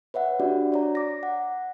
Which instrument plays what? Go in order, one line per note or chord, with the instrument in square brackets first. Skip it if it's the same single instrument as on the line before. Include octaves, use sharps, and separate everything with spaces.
[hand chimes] B4 C#5 E5 F#5
D4 F#4 G4 D5
C#5 D5 A#5
D6 A#6
F#5